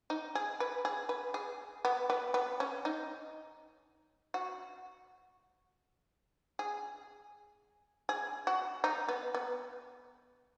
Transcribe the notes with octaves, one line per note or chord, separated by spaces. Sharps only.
D#4
G#4
B4
G#4
B4
G#4
B3
B3
B3
C#4
D#4
F#4
G#4
G#4
F#4
D#4
B3
B3